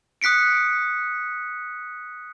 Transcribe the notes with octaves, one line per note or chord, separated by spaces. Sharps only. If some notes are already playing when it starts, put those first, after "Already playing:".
D#6 F#6 B6 C#7 D7